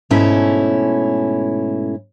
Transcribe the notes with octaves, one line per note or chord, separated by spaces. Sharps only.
G#2 B2 A3 C#4 E4